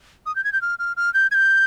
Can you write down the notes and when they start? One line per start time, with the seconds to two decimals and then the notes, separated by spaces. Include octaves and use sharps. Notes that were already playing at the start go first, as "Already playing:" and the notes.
0.26 D#6
0.36 G6
0.44 G#6
0.53 G6
0.62 F6
0.79 F6
0.97 F6
1.14 G6
1.31 G#6
1.34 G6